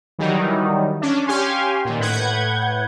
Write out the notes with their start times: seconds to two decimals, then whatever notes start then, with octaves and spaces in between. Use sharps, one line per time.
0.18 D#3 E3 F#3 G3 D#4
1.01 C#4 D4
1.27 C#4 G4 F5 G#5 C6
1.85 A#2 D#3
2.00 A2 B4 F#5 G6 G#6